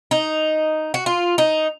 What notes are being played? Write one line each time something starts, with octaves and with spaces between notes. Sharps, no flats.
D#4
F#4
F4
D#4